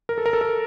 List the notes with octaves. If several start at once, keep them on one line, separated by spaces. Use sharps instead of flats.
A#4
A4
A#4
A4
A#4